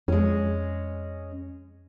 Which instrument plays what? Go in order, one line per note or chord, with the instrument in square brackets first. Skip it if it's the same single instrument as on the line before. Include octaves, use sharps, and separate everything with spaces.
[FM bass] F2 [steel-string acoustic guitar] G#3 C#4